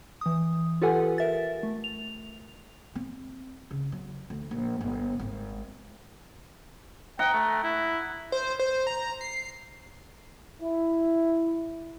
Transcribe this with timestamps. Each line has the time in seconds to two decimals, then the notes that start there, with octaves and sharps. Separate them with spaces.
0.21 E3 D#6
0.82 F4 G4 A4 B4 F#5 G#5
1.18 A#4 E5 A6
1.63 A3
1.84 F7
2.95 C4
3.71 C#3
3.92 F#3
4.30 D2
4.51 A#1
4.81 G1
5.20 G#1
7.19 D#5 F#5 G5 A#5
7.33 A3
7.63 E4
8.32 C5
8.59 C5
8.87 A#5
9.21 C7
10.61 E4